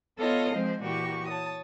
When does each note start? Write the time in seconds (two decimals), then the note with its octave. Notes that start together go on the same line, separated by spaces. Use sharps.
0.19 B3 F4 A4 C#5 D#5 F5
0.54 F3 G#3 C4 C5
0.82 A#2 E3 F#4 G4 C#6
1.28 C#5 A5 D#6